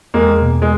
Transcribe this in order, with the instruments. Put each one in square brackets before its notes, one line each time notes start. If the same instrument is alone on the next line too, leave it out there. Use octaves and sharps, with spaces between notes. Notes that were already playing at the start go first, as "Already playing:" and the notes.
[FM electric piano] E2 [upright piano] G#3 A#3
[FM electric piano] B2
[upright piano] G#3